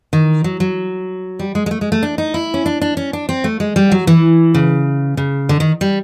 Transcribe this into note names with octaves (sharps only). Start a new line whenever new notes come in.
D#3
F#3
F#3
G3
G#3
G#3
A3
G#3
A3
D4
D#4
E4
C#4
D4
D4
C#4
D4
C4
A3
G#3
G3
F#3
E3
C#3
C#3
D3
D#3
G3